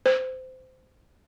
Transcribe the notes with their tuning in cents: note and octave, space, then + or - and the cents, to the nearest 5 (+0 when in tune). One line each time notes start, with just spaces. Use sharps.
C5 -20